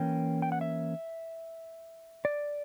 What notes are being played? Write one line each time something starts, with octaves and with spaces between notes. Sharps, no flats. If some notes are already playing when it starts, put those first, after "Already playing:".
Already playing: E3 A#3 C#4 G5
G5
F#5
E5
D5